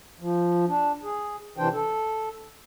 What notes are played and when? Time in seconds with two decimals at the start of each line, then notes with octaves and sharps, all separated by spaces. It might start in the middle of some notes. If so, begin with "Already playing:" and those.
0.21 F3
0.68 D4
1.03 G#4
1.58 C3 E3 D4 C5 G5
1.73 A4